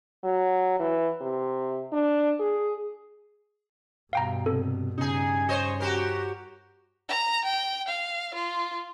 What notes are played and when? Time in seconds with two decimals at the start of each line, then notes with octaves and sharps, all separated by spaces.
0.24 F#3
0.79 E3
1.21 C3
1.93 D4
2.40 G#4
4.13 G2 B2 F5 G5 A#5
4.46 C3 A4
4.98 G2 C#3 D#4 G#4
5.49 C5 C#5 D#5
5.80 F#4 G4 A#4
7.09 A#5
7.45 G5
7.88 F5
8.34 F4